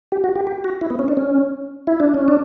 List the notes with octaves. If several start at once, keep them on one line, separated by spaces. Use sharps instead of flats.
G4
F#4
G4
G4
F#4
E4
B3
C#4
D4
C#4
E4
D4
C#4
D4